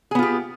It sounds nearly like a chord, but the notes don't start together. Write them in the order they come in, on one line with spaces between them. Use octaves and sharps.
G#4 B3 F4 G4